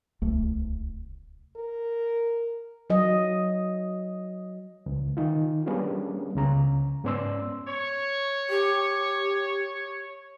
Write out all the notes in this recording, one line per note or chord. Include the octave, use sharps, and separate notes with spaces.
D1 C2 A3
A#4
F#3 D#5
C#2
D#3 D#4 F4
G3 A#3 B3 C#4 D4 G#4
C#2 C#3 A#5
G#2 B3 C#4 D5 C6 E6
C#5
G4